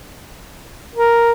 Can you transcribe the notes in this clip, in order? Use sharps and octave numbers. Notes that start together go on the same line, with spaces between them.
A#4